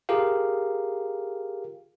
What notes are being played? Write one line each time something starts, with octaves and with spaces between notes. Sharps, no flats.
F4 G4 G#4 A#4 F5